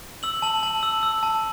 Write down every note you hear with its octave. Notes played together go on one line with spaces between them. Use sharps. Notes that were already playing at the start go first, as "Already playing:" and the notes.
E6 F#7
A5 F#7
A5 F#7
E6
E6
A5